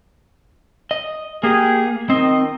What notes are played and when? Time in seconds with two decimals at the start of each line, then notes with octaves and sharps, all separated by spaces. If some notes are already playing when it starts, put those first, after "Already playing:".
0.91 D#5
1.43 A#3 G4 G#4
2.10 D#3 C4 D#5